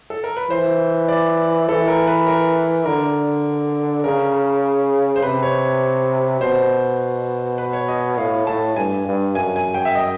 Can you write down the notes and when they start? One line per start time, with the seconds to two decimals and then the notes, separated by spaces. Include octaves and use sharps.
0.10 A4
0.24 A#4
0.37 B4
0.50 E3 C5
1.08 D5
1.68 E3 A4
1.88 A#4
2.07 B4
2.27 A#4
2.86 D3 A#4
4.04 C#3 A#4
5.16 C5
5.23 C3 B4
5.43 C#5
6.41 B2 C5
7.58 B4
7.73 C#5
7.88 D#5
8.18 A2 F5
8.47 A2 A5
8.76 G2 G#5
9.06 G2
9.35 F#2 G#5
9.56 G#5
9.74 G5
9.85 E5
9.95 D#5